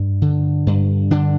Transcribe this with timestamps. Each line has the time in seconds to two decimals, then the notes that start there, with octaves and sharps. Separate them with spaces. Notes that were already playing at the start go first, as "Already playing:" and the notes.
Already playing: G2
0.22 D3
0.67 G2
1.11 D3 D4